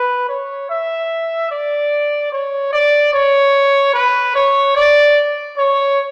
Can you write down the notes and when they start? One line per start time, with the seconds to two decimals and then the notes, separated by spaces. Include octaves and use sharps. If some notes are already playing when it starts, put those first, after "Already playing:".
Already playing: B4
0.29 C#5
0.70 E5
1.51 D5
2.32 C#5
2.73 D5
3.13 C#5
3.94 B4
4.35 C#5
4.76 D5
5.57 C#5